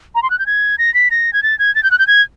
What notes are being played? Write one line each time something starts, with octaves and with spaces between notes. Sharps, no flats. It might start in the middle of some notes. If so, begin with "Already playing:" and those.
A#5
C6
F#6
G6
G#6
A#6
B6
A#6
G#6
A6
G#6
A6
G6
F#6
G6
G#6